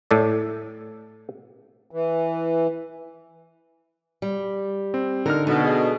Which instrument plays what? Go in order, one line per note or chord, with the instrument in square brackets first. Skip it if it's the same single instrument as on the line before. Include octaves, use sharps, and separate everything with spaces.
[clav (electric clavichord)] A2 A4 D5
[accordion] E3
[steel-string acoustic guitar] G3
[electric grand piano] C4
[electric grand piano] D3 D#4 F6 [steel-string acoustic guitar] A#4
[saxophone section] B2 [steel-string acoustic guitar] A3 D4
[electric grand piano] G#4 D#5